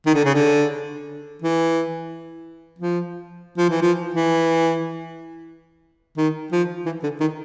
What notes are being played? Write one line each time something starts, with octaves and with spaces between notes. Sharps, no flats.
D#3
D3
C#3
D3
E3
F3
F3
E3
F3
E3
D#3
F3
E3
D3
D#3